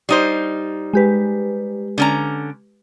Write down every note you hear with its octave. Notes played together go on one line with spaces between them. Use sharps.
G3 D#4 C5
G#3 G4 B4
D3 C#4 A#5